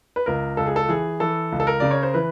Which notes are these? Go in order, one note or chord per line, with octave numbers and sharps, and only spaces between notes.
B4
C#2 A#4
C#2 A4
G#4
A4
E3 G#4
E3 A4
C#2
A4
A#4
C#3 D5
C#5
C5
E3 B4